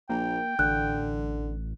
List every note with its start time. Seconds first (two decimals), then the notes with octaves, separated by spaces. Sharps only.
0.09 A#1 A#3 G5
0.59 A1 D3 F#6